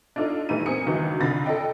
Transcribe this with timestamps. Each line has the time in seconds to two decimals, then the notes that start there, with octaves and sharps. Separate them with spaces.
0.16 D4 D#4 F4 A4 D#5
0.49 A#1 E3 G3 A3 D#4 D#7
0.66 A#3 C4 G#5 D#6 C#7
0.86 C#2 G2 D#3 E3 F#3
1.20 C2 D3 F4 B5 A6 A#6
1.46 A4 D5 D#5 G5